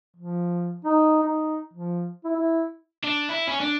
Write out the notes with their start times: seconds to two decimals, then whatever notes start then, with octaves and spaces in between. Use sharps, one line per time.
0.16 F3
0.84 D#4
1.23 D#4
1.73 F3
2.24 E4
2.36 E4
3.04 D4
3.29 E4
3.47 C#4
3.60 D4